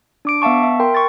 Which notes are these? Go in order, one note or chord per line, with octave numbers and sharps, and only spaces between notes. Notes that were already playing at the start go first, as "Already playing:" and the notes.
D4 D6 D7
B3 E5 F5 A5 C#6
E5
A#4 G5 C6
C#6 A6